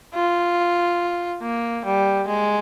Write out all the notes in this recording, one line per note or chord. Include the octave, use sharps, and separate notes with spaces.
F4
A#3
G3
G#3